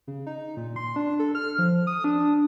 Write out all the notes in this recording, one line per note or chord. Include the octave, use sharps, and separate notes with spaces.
C#3
D#4
A#2
C6
D4
A4
F6
F3
D#6
D4